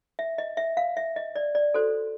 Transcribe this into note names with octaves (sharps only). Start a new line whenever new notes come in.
E5
D#5
E5
F5
E5
D#5
D5
D5
F#4 A4 C5